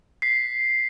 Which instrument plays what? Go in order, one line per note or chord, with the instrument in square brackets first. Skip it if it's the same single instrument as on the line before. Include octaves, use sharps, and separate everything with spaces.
[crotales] B6 C7